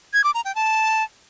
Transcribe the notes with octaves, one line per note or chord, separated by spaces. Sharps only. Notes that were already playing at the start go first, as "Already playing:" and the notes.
G#6
D6
A#5
G5
A5